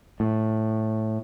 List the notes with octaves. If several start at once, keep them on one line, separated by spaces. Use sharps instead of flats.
A2